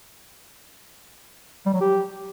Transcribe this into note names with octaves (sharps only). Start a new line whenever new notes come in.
G3
F#3
G4